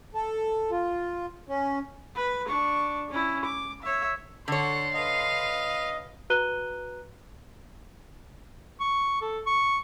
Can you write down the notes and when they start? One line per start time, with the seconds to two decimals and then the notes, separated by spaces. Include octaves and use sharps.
0.14 A4
0.71 F4
1.48 C#4
2.15 B4 B5
2.47 D4 C#6
3.10 C#4 E4
3.45 D6
3.83 C#5 E5
4.48 D3 A4 C#5 F#5 C6
4.94 B4 D#5 F5
6.30 F#4 B4 A#5 F#6 D#7 G7
8.80 C#6
9.21 A4
9.47 C#6